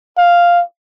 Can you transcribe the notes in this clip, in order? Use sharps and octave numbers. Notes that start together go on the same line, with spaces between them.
F5